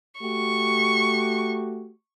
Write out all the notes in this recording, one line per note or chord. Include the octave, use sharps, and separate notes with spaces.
A3 F#4 G4 C#6